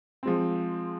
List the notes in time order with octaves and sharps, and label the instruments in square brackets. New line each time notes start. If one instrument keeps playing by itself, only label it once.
[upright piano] F3 G#3 C4